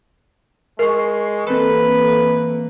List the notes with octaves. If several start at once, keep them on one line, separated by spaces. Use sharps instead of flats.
G#3 A#4 C#6 C7
E3 A#3 C4 A4 B4